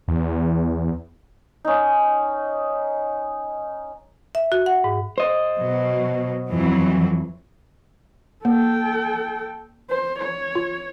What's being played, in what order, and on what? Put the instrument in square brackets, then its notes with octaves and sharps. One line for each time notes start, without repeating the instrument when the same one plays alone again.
[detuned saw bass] E2
[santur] C#4 D#4
[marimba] E5
F#4
F#5
G#2
[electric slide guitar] C5 D#5
[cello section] B2 F#3
F2 E3 F#3
[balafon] A#3 [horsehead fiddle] A4 G5
[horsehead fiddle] C5
C#5
[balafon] F4